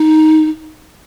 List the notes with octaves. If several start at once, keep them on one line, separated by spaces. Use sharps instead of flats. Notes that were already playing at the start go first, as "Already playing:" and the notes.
Already playing: D#4